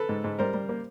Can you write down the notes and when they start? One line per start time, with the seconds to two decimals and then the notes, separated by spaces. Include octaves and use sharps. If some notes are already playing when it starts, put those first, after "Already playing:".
Already playing: A4 B4
0.09 G#2
0.24 G#2
0.39 G3 A#4 C5
0.54 G3
0.69 A#3